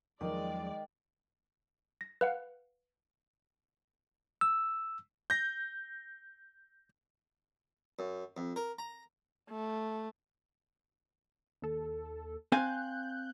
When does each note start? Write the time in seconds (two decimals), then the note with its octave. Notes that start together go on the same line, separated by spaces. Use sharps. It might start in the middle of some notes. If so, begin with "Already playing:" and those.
0.21 E2 D#3 F3 F#3 G#3 D5 D#5 G5
2.01 A#6
2.21 B4 F5 F#5
4.41 E6
5.30 G6 A#6
7.99 F#2
8.37 F2
8.56 A#4
8.79 A#5
9.50 A3
11.62 D#2 A4
12.52 C4 F5 G#5 F#6 G6